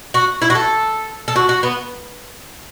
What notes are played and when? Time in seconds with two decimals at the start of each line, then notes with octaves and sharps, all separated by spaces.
0.14 F#4
0.42 E4
0.50 F#4
0.55 A4
1.28 A4
1.36 F#4
1.49 F#4
1.63 B3